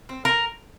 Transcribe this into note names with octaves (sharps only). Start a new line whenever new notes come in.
C4
A#4